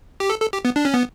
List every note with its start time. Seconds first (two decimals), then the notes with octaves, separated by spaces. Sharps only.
0.20 G4
0.30 A4
0.41 A4
0.53 G4
0.65 B3
0.76 D4
0.85 C#4
0.94 B3